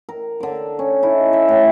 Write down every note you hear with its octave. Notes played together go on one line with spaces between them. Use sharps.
A#4
D3 D6
C#4
D#4 E4
E5
A2 G4